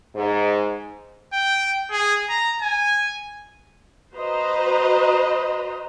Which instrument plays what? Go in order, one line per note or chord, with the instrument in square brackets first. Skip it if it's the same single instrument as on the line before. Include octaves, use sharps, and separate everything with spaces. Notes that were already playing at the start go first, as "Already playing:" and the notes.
[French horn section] G#2
[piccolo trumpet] G5
G#4
A#5
G#5
[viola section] F#4 B4 C5 D#5 A#5